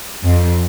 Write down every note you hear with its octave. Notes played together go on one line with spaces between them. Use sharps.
F2